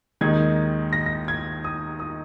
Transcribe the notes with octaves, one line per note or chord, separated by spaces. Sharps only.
D#2 D#3 G#3 D#4 G#6
A#6
A#6
G#6
D#6
D#6